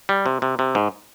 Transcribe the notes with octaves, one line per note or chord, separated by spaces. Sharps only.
G3
C3
C3
C3
G#2